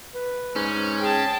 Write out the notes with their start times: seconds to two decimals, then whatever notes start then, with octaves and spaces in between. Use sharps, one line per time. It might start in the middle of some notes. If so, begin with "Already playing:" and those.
0.14 B4
0.56 G#2 C#4
1.00 G#4 G5 A5